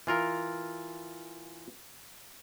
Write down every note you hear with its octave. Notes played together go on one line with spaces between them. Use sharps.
E3 F4 A#4